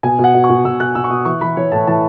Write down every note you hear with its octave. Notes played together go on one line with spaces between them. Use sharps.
B2 G#5
B2
F#5
B2
C#6
B2
B2 E6
B2 F#6
B2 E6
C#6
B2 D#6
E3 C#6
E3 B5
E3 C#5
A2 A5
E3 A5